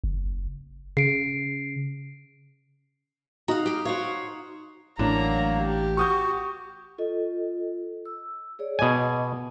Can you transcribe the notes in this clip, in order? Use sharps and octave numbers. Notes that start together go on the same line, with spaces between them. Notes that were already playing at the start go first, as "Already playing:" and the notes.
F#1
C#3 C7 D7
D#4 F#4 F5 D#6
G4 F5
F#4 C5 C#5 F5
A1 A2 F#3 A#3 D4 A#5
G4
F#4 C#6 D#6 G6
F4 A4 D#5
E6
G#4 C#5 D5
B2 D#5 G#5 D6 D#6